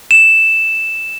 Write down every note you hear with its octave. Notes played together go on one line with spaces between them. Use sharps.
E7